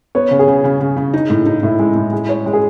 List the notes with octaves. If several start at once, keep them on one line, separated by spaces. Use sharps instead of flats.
B3 C#5
C#3
G#4
C#3
C#3
C#3
C#3
D#4
A2
D#4
A2 E4
G#3
A2
G#3
C#5
G#3
G#4